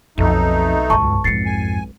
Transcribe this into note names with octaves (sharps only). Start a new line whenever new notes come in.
B1 F2 A3 D#4
C#2 G2 A5 C#6
F2 G#2 A6 C7 C#7
G#5